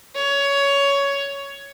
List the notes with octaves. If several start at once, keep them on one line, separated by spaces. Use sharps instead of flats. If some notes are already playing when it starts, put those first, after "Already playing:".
C#5